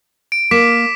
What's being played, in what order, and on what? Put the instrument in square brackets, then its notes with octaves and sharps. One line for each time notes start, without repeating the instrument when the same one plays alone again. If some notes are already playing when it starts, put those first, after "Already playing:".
[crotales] D7
[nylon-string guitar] A#3 [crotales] D6 B6 E7